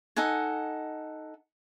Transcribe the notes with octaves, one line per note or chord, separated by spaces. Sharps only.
D#4 A4 F#5 G#5